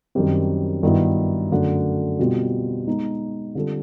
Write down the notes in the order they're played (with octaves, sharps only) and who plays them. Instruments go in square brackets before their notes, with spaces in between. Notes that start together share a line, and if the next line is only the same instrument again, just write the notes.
[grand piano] F#2 D#3 G3 C4
G2 D#3 F#3 B3 E4
F#2 D3 F#3 A3 D4
B2 G3 C4 F4
G#3 B3 D#4
D3 G3 C4 F4 A4